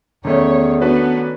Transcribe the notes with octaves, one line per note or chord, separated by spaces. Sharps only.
E2 D#3 A3 C#4 C#5
B3 D4 F#4 B4